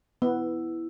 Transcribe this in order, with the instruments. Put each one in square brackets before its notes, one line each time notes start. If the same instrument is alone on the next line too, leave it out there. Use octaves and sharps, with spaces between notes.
[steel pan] B3 [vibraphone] E4